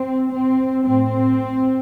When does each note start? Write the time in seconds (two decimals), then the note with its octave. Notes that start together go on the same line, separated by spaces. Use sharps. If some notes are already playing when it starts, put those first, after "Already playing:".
Already playing: C4
0.33 C4
0.87 A2 C4